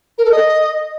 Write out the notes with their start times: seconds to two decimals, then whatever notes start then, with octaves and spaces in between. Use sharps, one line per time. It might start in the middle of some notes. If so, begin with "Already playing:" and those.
0.18 A#4
0.25 A4
0.31 D#5